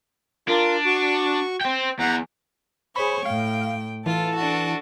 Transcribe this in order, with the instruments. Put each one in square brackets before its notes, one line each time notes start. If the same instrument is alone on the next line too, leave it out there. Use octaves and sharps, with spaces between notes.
[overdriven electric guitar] D4 [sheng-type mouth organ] F4 A#4
[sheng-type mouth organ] F#4 C#6
[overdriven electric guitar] C5 G5
[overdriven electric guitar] E2 [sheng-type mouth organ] F#5 A#5
[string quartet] G#4 C#5 C#6 [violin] C5 [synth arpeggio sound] B5
[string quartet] A2 [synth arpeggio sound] F5 [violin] G5
[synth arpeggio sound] E3 [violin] F4 [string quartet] A4
[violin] D4 F#4